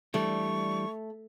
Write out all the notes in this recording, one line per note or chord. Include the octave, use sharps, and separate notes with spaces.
E3 G3 A3 D4 C#6